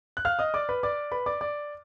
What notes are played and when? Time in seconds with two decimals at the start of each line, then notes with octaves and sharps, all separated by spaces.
0.17 F#6
0.25 F5 F6
0.39 D#5 D#6
0.54 D5 D6
0.69 B4 B5
0.83 D5 D6
1.12 B4 B5
1.26 D5 D6
1.41 D5 D6